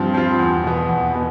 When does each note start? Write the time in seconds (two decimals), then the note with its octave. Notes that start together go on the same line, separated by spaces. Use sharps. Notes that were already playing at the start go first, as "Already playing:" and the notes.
Already playing: G2 F3 C4 F4
0.14 F3 C4 F4
0.39 E2
0.63 B2 B3
0.89 E2
1.13 B2 B3